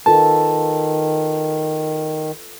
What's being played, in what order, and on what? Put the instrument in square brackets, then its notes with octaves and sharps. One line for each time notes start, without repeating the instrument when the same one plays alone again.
[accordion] D#3 [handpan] F4 A4 B4 [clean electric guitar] A5